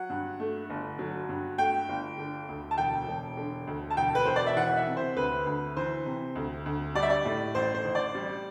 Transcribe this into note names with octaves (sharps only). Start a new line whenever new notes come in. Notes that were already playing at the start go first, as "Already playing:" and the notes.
Already playing: F#3 F#5
G2
A3
G1
F#3
G2
A3 G5
G1
D3
D2
A5
E1 G5
E1
D3
D2
A5
E1 G5
B4
E1 C5
D5
E5
E3 F#5
E5
C3
C5
D2 B4
D2
E3 C5
C3
D2
D2
G3 D5
E5
D5
A2
A1 C5
C5
A1
D5
G3